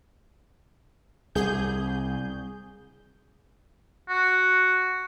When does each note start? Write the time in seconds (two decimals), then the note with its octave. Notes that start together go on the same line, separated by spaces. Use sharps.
1.35 C2 G#4 G6
4.08 F#4